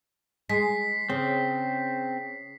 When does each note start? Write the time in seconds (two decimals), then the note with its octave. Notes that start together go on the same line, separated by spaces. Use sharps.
0.50 G#3 B6 C7
1.10 C#3 C4